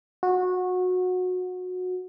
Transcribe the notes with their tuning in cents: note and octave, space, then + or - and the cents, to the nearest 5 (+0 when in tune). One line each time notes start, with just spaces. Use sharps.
F#4 -20